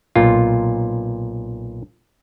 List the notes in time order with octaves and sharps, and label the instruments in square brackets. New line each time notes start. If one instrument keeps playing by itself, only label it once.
[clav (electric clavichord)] B1 A#2 F4